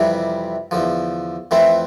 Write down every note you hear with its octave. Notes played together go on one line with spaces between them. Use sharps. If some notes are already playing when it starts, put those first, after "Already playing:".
Already playing: F2 C3 E3 G3
E2 D3 F3
F2 E3 A3 C4 E4